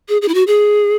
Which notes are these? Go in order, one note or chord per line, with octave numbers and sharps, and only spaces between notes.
G#4
G#4
E4
F#4
G#4